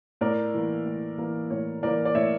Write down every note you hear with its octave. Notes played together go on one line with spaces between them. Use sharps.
A2 A#4 D5
E3 A#3
A2
E3 A#3
A2 C#5
E3 A#3 A#4 D5
D5
A2 C#5 E5